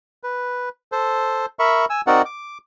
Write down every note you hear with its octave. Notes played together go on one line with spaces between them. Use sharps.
B4
A4 C5
A#4 E5 B5 C#6
G#5 E6
C4 D#4 F#4 A#4 D5 F#5
D6